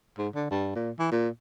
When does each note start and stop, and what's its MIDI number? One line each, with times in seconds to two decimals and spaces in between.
0.18 0.29 44
0.35 0.50 50
0.51 0.71 43
0.75 0.91 46
0.99 1.10 52
1.12 1.29 46